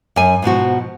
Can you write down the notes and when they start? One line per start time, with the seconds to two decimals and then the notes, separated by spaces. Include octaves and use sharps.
0.16 F#2 G#5
0.42 G#2 B2 F3 F#4